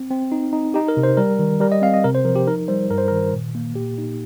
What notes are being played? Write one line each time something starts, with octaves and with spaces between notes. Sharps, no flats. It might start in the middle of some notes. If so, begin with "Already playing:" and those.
Already playing: C4
C4
D#4
D#4
D#4 G4
A#4
C3
C5
G3 A#4
D#3
G3 A#4
D#5
C4 F5
D#5
C3 A#4
C5
F3 A#4
G4
D#4 A#4
G3 C5
G2 A#4
C5
D#3 A#4
A#2
A#3
A#2 G4
D#4